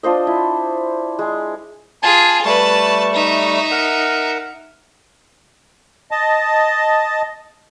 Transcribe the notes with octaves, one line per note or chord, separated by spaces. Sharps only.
D4 F4 C5 D#5
E4
G#3
F4 G#4 G#5 A5
G3 A3 B4 A5 C#6
D#4 E5
A#4 F#5
D#5 A5